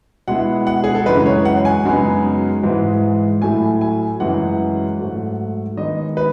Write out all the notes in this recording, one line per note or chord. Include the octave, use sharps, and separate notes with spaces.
B2 G#3 B3 E4 F#5
F#5
G#4
A4
F#2 C#3 E3 G#3 B4
C#5
F#5
G#5
F#2 C#3 G#3 B3 D#4
G#2 E3 G#3
A2 F#3 A3 E4 G#5
G#5
F#2 C#3 E3 G#3 F#5
G#2 F#3 A3
D#3 G#3 B3 D#4 D#5
B4